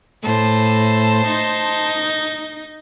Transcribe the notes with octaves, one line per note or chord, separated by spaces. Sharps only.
A2 C5 A5
D#4